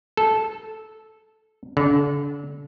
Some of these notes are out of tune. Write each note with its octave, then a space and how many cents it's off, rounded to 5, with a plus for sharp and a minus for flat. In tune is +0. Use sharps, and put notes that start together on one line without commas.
A4 -10
D3 -35